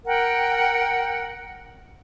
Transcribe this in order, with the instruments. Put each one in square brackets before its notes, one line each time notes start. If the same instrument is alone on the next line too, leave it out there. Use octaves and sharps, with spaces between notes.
[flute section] A#4 F#5 G5